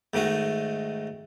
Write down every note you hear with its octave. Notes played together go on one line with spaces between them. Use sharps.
G#2 D#3 A3 F#4